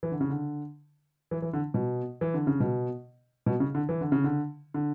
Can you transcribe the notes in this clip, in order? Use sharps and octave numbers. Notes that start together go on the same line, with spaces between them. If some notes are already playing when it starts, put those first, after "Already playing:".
E3
D3
C#3
D3
E3
E3
D3
B2
E3
D3
C#3
B2
B2
C#3
D3
E3
D3
C#3
D3
D3